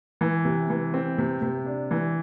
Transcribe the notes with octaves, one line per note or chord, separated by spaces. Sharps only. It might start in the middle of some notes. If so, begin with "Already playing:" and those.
E3
C3
E3
C4
C3
C3
D4
E3